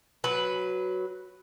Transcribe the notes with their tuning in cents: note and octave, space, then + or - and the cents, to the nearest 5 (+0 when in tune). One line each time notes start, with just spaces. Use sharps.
F#3 +0 B4 +0